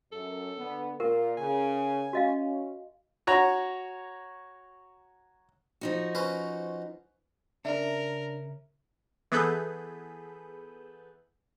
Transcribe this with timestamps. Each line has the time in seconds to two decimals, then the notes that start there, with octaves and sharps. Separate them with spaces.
0.12 F#2 A4
0.58 D3 B3
1.00 A#2 F4 A#4
1.37 C#3 G#5
2.13 C#4 F#4 D#5 F5
3.27 F#4 C#5 A#5
5.81 F3 D#4 F#4
6.15 C#4 B4 C5
7.65 C#3 D4 A#4 E5
9.32 E3 B3 G#4 A4 B4 G6